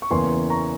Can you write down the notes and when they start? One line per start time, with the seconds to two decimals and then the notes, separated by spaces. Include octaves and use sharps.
0.02 C#6
0.11 E2 C#3 E3 A#3 C#4 G#5 C6
0.50 A#5 C#6